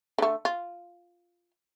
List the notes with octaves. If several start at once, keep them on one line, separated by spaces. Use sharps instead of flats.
D3 A3
F4